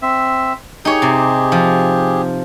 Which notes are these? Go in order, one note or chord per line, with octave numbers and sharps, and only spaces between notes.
C4 E5
D#4 G4 G#4 C#5
C3
F3